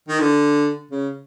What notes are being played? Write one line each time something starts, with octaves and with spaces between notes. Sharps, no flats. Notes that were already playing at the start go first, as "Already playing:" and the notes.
D#3
D3
C#3